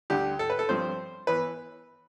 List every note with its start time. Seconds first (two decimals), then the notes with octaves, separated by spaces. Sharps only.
0.10 D2 D3 G3 G4
0.39 A4
0.50 B4
0.59 A4
0.69 G2 F3 C4 C5
1.27 E3 B3 B4